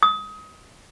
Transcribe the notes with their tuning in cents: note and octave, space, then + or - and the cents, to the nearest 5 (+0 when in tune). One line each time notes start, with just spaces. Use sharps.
D#6 +25